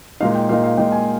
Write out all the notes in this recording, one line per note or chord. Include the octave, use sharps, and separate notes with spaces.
A#2 G#3 D#4 F5
G5
A#2 G#3 D#4 F5
F5
A#2 G#3 D#4 G5
G#5